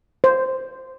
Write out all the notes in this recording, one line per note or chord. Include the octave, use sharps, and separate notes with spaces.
C5